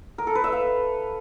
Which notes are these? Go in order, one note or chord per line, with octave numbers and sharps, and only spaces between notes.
A#4
A4
B4
E5
F5